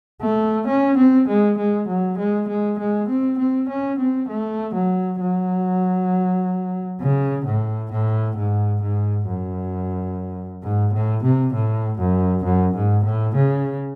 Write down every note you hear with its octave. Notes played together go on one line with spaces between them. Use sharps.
A3
C#4
C4
G#3
G#3
F#3
G#3
G#3
G#3
C4
C4
C#4
C4
A3
F#3
F#3
C#3
A2
A2
G#2
G#2
F#2
G#2
A2
C3
A2
F#2
F#2
G#2
A2
C#3